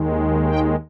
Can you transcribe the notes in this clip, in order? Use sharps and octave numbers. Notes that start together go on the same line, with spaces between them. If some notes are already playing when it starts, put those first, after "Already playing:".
Already playing: D#2 D#3 G#3
G5